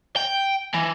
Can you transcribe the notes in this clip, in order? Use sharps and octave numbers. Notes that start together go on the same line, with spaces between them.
G5
E3